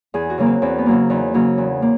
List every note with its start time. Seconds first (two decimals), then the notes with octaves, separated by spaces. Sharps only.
0.14 E2 G#4
0.30 F#4
0.38 C#3 F#3 A#3
0.46 C4
0.62 E2 C4
0.78 B3
0.86 C#3 F#3 A#3
1.10 E2 D#4
1.34 C#3 F#3 A#3
1.58 E2
1.82 A#3